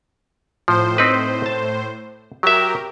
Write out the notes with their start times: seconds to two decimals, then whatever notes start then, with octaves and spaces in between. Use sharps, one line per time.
0.68 A2 F3 C5
0.98 C4 D#4 B4
1.46 A5
2.43 F#3 G4 A#4 E5